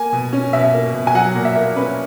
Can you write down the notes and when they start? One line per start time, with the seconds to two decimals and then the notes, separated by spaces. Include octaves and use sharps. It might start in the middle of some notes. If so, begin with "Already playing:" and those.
Already playing: A#3 G#5
0.12 B2
0.33 C#4
0.53 B2 E5
0.73 A#3
0.94 B2
1.07 G#5
1.14 F#3 F#5
1.35 A#2
1.45 E5
1.56 A#3
1.76 C#4 B4